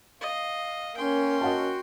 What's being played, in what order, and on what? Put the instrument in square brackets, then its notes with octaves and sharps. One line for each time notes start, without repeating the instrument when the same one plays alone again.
[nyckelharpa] D#5 [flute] F5
[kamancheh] A#3 C#4 [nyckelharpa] G5 C6
[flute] F#4 [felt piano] D#5 F#5 A5